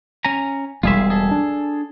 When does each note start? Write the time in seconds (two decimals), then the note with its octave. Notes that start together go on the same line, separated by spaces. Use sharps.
0.25 C#4 G#5 A#5
0.83 E1 G3 G#3 F4 G#4 E5
1.10 G#4 A4
1.31 D4